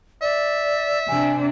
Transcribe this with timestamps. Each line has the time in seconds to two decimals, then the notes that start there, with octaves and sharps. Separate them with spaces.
0.22 D5 E5
1.08 C3 D4 G#5